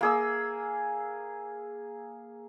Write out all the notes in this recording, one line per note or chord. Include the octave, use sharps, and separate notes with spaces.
A#3 G#4 E6